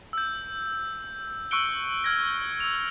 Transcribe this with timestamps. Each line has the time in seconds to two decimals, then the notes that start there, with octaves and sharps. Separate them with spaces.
0.13 E6 G6
1.51 C#6 E6 F#6 C#7 D7 G7
2.04 F6 G#6 A#6
2.60 E6 F7